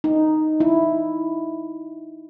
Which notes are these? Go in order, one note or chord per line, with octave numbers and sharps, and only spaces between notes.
D#4
E4